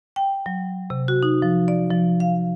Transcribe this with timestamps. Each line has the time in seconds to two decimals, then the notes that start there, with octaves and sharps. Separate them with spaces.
0.16 G5
0.46 F#3
0.90 C3
1.08 F#4
1.23 D#4
1.42 F3
1.68 D5
1.91 F3
2.20 F5